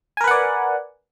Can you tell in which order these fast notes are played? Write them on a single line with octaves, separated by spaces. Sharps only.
G#5 A#4 B4 F#5 D5